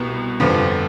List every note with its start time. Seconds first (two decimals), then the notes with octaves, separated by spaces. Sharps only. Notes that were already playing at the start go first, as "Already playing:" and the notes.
Already playing: C2 B2 B3
0.40 G1 F2 D3 F3 B3